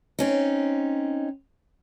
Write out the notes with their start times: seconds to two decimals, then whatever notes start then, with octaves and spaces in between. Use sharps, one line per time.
0.19 C4 C#4 D#4